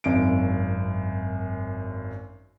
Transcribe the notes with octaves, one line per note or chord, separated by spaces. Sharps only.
G#1 F#2 D7